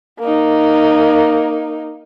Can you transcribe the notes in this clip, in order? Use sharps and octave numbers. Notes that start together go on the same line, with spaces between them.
A#3 D#4